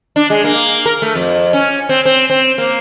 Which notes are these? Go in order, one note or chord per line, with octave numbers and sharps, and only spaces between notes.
D4
G#3
A#3
A#4
A3
F2
C#4
C4
C4
C4
A#3